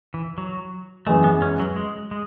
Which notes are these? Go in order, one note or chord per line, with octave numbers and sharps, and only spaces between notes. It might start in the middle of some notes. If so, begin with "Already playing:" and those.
E3
F#3
F#2 E3 G#3 A3
B3
C#4
F#3
G#3
G#3